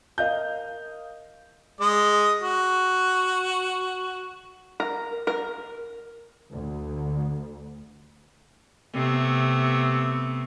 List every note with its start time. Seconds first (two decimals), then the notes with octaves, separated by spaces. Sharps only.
0.18 A#4 D#5 F5 G6
1.81 G#3 D#5
2.42 F#4
4.80 A#4
5.27 A#4
6.52 D2
8.93 C3 A3 B3